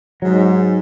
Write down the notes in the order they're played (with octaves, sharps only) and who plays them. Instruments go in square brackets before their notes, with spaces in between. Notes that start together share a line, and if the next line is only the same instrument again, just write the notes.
[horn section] G#2 [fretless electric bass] F#3